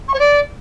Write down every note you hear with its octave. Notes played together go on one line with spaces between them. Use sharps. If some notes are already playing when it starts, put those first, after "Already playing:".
C#6
C#5
D5